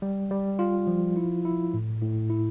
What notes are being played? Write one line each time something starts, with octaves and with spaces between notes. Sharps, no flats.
G3
G3
F4
F3
E4
E4
A2
A2
E4